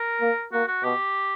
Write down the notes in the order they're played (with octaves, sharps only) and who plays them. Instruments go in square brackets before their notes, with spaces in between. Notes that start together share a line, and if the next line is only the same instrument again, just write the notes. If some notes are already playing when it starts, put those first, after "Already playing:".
Already playing: [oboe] A#4
[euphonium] A#3
[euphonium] A#3 [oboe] F#4
[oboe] F#4
[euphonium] B2 [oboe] G4